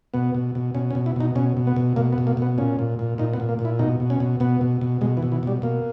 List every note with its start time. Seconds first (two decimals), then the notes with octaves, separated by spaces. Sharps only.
0.14 B2 B3
0.35 B2
0.55 B2
0.74 B2 C#4
0.91 C#4
0.95 B2
1.06 E4
1.16 B2 D#4
1.35 B2 C#4
1.57 B2
1.67 B3
1.76 B2
1.96 B2 A#3
2.13 B3
2.18 B2
2.27 A#3
2.37 B2 B3
2.58 A#2 C#4
2.79 A#2
2.99 A#2
3.18 A#2 D#4
3.33 B3
3.40 A#2
3.49 A#3
3.59 A#2
3.65 E4
3.79 B2 D#4
4.00 B2
4.10 C#4
4.20 B2
4.40 B2 B3
4.61 B2
4.81 B2
5.01 B2 G#3
5.17 E3
5.23 B2
5.32 E3
5.43 B2 G3
5.62 B2 A#3